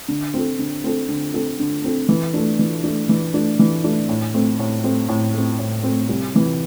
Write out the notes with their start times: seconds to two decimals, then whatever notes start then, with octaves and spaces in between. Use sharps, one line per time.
0.08 D3
0.34 C4 A4
0.59 D3
0.84 C4 A4
1.08 D3
1.34 C4 A4
1.59 D3
1.84 C4 A4
2.09 E3
2.34 A3 D4
2.59 E3
2.84 A3 D4
3.09 E3
3.34 A3 D4
3.59 E3
3.84 A3 D4
4.09 A2
4.34 A3 C4
4.59 A2
4.84 A3 C4
5.09 A2
5.34 A3 C4
5.59 A2
5.83 A3 C4
6.08 C2
6.34 C3 E3